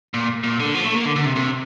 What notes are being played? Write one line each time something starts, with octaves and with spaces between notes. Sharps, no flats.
A#2
A#2
D3
F3
A3
A#3
D3
D3
C3
C3